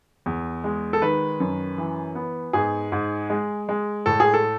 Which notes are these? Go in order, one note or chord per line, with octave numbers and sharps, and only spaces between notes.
E2
G#3
A4
D#3 B4
F#2
E3
B3
G#2 G#4
G#2
G#3
G#3
A2 A4
G#4
A4